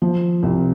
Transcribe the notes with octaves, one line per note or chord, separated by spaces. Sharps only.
F3
C2